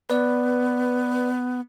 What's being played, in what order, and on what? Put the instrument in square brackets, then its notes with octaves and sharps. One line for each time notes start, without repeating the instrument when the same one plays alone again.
[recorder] B3 [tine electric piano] B4 D5